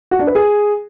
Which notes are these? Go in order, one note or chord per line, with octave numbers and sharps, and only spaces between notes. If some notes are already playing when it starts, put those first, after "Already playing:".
F#4
D4
B4
G#4